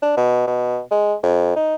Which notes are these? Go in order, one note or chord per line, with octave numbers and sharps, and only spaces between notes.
D4
B2
B2
G#3
F2
D#4